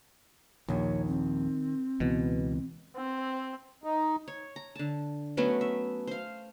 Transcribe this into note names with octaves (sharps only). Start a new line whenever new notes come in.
A#1 D#2 D#3 C#5
C4
C#2 B2 E3 B3
C4
D#4
C#5
A#5
D3 A5
F#3 A3 B3 C#4
E5
C5 F5